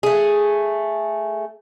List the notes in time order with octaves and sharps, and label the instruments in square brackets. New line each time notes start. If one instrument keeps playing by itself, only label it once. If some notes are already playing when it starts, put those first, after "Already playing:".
[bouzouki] A3 G#4